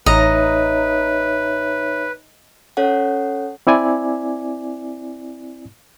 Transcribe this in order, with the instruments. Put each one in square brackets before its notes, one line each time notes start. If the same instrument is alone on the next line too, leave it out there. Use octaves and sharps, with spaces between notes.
[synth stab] A1 A#5 [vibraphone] D#4 C#5 E5 [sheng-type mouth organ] B4 [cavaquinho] D#5
[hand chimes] C#4 A4 C#5 F#5
[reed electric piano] C4 E4 D5 G#5